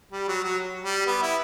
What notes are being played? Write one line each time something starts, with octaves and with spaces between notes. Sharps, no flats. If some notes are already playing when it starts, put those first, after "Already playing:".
G3
F#3
F#3
G3
B3
E4